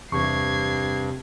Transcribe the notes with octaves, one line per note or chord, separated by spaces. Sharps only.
E2 G2 C3 C#6 G#6 C7